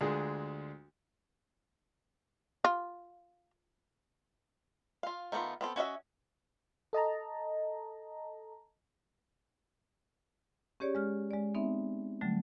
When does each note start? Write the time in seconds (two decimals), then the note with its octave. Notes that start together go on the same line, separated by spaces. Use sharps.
0.01 D2 G#3 D4 F4 G#4
2.65 F4
5.03 F4 F5
5.32 D#3 A3 B3 D4 F4
5.61 B3 C4 A4
5.76 C#4 F#4 D#5 E5
6.93 A4 D#5 A5 A#5
10.80 C#4 G4 G#4 C#5 D5
10.95 G#3 F6
11.31 G#3 D5
11.54 B3 C4 D#4 E5
12.21 D3 F#3 G3 A3